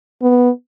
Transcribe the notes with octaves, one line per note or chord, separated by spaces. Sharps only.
B3